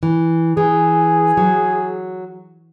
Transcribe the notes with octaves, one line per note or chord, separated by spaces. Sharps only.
E3
E3 G#4
F#3